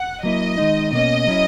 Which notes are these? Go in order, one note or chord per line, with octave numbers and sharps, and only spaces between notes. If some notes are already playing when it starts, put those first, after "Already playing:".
Already playing: F#5
F#3 A#3 E4 D#5
D#3 G#3 D#4
B2 A#3 C#4 D#5
F#3 C#4 E4